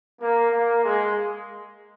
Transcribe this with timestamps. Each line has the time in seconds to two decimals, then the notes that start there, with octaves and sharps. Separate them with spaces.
0.20 A#3
0.51 A#3
0.83 G#3